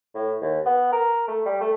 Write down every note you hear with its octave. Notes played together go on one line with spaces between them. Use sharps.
A2
D#2
B3
A#4
A3
G3
A3